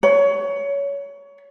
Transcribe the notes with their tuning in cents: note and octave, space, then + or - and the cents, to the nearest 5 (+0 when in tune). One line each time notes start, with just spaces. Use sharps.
C#5 +20